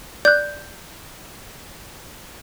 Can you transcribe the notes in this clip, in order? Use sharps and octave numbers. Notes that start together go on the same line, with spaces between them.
D5 F#6 G6